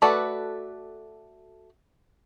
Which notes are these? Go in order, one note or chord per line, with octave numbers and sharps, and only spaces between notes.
A3 F#4 A4 B4 D5